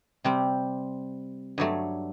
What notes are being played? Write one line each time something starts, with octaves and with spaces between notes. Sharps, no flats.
C3 G3 C4
G2 F#3 A3